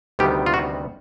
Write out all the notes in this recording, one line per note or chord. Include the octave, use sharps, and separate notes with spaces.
D2 C3 D#3 G3 B3 G4
F4
F#4